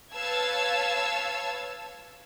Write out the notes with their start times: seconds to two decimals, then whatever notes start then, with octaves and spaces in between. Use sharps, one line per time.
0.13 B4 C#5 F5 A5 E6 G#6